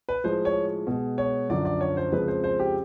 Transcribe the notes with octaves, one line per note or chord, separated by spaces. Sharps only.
B4
A2 F3 G#3 C5
C#5
B2 G#3
C#5
F#2 D3 F3 D5
D5
C#5
C5
F2 C#3 F3 G#3 B4
C5
C5
G4